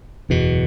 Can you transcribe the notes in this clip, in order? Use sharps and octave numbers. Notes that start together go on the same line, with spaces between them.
F#1 E2 B2